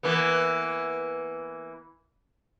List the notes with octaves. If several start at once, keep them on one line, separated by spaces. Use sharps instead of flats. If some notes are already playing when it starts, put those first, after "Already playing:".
E3 A#3 B3